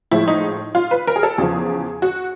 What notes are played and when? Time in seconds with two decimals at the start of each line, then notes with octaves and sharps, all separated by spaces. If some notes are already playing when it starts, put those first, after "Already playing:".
0.11 A2 F3 G#3 E4
0.28 D#4
0.75 F4
0.91 B4
1.07 A#4
1.16 G#4
1.23 A4
1.38 E2 C#3 F3 G#4
2.02 F#4